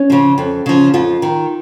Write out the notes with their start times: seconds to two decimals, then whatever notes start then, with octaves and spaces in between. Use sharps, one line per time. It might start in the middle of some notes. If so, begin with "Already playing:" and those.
Already playing: C#4
0.10 C#3 F3
0.38 F2
0.66 C#3 F3
0.94 F2 F4
1.22 D#3